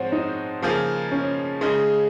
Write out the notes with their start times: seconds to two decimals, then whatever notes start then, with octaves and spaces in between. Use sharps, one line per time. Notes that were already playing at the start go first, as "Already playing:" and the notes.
Already playing: G#2 F3 C4 F#4 C5 C#5
0.12 D#4
0.63 C#3 F3 A#3 F4 G#4
1.12 C#4
1.61 C#3 G#3 D#4 G#4